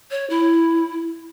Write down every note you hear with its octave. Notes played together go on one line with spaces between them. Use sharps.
C#5
E4